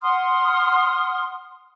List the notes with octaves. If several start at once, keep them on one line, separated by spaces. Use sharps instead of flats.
F#5 C6 D#6 F6